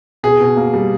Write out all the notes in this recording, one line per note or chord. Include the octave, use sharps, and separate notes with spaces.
B2 G#4
B2
A#3
G3